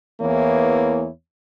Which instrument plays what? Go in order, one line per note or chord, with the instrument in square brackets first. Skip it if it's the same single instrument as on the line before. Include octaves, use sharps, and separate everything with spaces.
[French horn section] E2 E3 A#3 B3 C#5